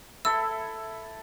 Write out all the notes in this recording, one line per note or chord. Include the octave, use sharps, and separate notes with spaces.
E4 A4 E5 E6